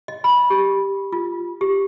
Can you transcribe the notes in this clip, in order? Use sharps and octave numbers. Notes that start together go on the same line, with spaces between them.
D#5
B5
G4
F4
G4